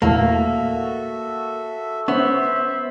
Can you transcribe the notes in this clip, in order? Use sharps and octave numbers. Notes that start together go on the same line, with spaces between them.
E2 A#2 A3 A#3 F#4 A4 E5
B3 C#4 C5 E5